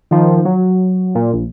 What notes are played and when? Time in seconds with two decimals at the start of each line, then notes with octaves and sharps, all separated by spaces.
0.11 D#3 F3
0.45 F#3
1.15 A#2
1.33 A#1